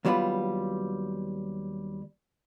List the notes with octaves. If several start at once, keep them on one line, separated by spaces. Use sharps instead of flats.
D#2 F#3 G3 B3 F4 B5